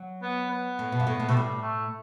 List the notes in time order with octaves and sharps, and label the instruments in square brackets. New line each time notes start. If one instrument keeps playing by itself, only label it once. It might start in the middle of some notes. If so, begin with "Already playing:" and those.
Already playing: [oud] F#3
[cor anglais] B3
B3
[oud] A2
B2
G2
A2
A2
[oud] B2 [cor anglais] A3
[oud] A2 [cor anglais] G3
[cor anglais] A3